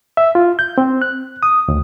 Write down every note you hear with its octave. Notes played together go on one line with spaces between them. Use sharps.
E5
F4
G6
C4
F#6
D#6
D2